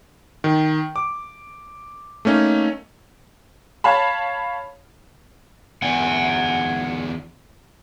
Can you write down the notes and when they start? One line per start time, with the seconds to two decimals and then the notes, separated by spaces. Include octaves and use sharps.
0.44 D#3
0.96 D6
2.25 A3 A#3 C#4 D#4
3.84 C#5 F5 A5 B5
5.82 E2 D3 F#5 G#5